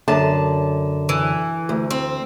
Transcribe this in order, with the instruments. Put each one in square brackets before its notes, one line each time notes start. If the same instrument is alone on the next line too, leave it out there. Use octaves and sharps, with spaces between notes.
[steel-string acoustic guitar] F#2 D3 A5
[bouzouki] E3
[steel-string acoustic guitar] D2
[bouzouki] C4